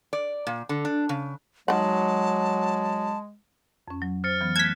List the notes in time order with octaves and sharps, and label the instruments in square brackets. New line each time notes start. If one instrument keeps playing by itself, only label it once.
[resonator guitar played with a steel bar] D5
A#2
D3
D4
C#3
[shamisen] D#3 F#5 [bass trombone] F#3 [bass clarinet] G#3 [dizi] A5
[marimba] F2 C#4
F#3
[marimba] C5 [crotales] F6 A6 C#7
[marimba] E3 F#3 B3
[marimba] A3 [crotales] F#6 E7 [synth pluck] G#6 B6